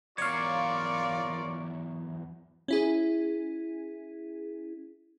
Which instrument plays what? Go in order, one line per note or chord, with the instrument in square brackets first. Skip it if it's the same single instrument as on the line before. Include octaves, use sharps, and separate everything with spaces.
[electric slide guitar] E2 F#3 [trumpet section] F4 A#4 D5 [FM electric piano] C#5 F5 [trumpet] C#6
[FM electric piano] C#4 E4 G#4